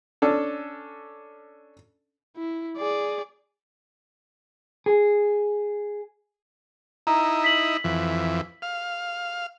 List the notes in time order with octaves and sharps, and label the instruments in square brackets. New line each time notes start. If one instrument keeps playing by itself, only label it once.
[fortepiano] C#4 D4 A4
[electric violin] E4
G#4 D5
[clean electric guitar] G#4
[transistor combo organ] D#4 E4 [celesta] A#5
[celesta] B6 F#7
[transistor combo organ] F2 E3
F5